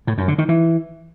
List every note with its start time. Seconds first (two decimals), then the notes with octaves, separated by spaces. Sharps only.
0.07 A2
0.18 F#2
0.28 D3
0.38 D#3
0.49 E3